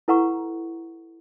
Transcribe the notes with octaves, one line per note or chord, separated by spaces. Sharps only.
E4 A4 B4 F#5 A#5 C#6